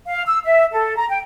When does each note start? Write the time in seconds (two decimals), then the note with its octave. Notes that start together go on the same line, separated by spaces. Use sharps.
0.08 F5
0.28 E6
0.44 E5
0.72 A4
0.97 A#5
1.09 G5